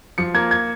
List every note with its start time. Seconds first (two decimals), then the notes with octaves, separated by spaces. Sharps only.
0.18 F3 C#7
0.34 A#3 G#6
0.51 G#6